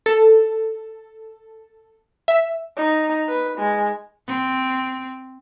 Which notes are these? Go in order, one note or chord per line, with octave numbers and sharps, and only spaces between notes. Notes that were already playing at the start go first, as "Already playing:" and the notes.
A4
E5
D#4
B4
G#3
C4